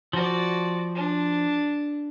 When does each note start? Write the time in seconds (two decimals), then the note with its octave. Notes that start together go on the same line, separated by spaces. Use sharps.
0.13 F3 F#4 D5
0.95 D4